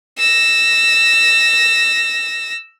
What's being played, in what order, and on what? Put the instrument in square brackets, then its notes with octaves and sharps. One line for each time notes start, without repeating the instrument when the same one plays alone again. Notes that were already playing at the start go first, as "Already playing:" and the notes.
[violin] E6 A#6